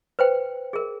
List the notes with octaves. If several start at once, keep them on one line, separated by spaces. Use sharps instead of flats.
B4 C5 G5
G#4 A#4